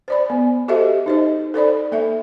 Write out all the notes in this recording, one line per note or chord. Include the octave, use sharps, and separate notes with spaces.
C5 D5 B5
B3
F#4 G4 A4 C5 D#5 E5
D#4 C5 D#5
A4 C5 D5 B5
A#3 A4 E5